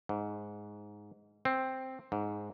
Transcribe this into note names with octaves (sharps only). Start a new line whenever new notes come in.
G#2
C4
G#2